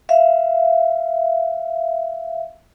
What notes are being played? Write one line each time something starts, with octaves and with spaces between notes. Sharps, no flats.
E5 F5